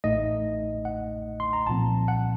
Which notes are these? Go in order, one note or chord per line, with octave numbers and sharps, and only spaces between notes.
A1 A2 A3 D#4 D#5
F#5
C6
A#5
C2 A#2 F3 C4 A5
F#5